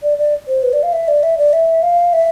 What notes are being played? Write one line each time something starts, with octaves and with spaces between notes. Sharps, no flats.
D5
D5
C5
B4
D5
F5
E5
D5
E5
D5
E5
F5
E5